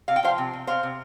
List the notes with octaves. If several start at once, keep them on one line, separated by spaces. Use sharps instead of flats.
C3 F5
G5
F3 C5 F5
C3
C3
C3 C5 F5
C3